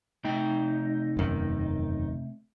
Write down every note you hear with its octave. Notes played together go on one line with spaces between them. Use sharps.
C3 A3 D#4 G5
E1 F#2 D#3